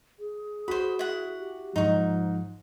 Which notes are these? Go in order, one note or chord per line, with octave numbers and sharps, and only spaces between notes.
G#4
F#4 C5 B5
E4 F#5
G4
G#2 F3 D#4 C#6